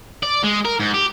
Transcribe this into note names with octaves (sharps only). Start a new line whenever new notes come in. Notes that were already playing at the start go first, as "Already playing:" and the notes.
D5
G#3
A#4
G#2
G4